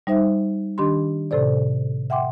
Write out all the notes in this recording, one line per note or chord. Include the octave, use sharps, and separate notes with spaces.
G3 D#4 C5 E5
D#3 D4 G4 B5 C6
A2 C3 A4 C5 D5
E5 F#5 G5 C6 D6